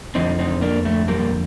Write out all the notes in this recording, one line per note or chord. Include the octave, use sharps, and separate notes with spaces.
F2 D3 F3 C4 D#4
C4 D#4
A#3 D4
A3
G3 A#3